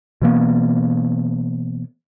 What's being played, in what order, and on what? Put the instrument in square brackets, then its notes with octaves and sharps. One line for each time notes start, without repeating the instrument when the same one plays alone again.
[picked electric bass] B2 E3 A#3 B3